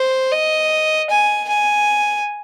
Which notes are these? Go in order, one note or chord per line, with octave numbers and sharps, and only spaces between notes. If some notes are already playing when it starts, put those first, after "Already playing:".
Already playing: C5
D#5
G#5
G#5